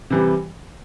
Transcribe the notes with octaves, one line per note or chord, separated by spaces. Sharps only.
C3 E3 G3